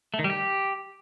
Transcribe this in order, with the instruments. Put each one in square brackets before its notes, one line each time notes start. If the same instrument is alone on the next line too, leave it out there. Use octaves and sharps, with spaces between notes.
[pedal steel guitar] A3
D#3
G3
G4